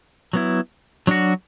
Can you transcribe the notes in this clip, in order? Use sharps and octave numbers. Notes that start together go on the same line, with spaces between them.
F#3 B3 E4
F#3 D4 F#4